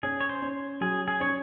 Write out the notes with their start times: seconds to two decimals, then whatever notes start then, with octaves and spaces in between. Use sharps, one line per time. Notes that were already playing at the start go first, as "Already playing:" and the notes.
0.03 C#4 G#4
0.21 C#5
0.29 C5
0.42 C#4
0.81 F#3 G#4
1.08 G#4
1.20 C#4 C#5